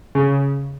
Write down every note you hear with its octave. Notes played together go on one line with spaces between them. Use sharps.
C#3